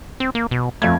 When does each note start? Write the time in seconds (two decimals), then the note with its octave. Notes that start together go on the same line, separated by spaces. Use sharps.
0.20 C4
0.35 A#3
0.51 B2
0.82 F2 A3 F5 G#6